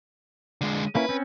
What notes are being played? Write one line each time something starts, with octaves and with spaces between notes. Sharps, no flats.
D3 G#3
A#3 C#4 E4 B4
C4 C#4